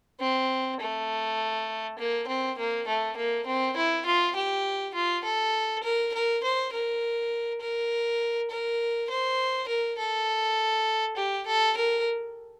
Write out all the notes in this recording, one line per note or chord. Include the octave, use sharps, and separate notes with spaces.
C4
A3
A#3
C4
A#3
A3
A#3
C4
E4
F4
G4
F4
A4
A#4
A#4
C5
A#4
A#4
A#4
C5
A#4
A4
G4
A4
A#4